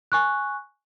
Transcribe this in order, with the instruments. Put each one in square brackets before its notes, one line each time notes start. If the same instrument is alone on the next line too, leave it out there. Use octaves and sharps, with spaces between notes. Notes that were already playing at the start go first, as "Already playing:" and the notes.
[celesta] G#5 C#6 F#6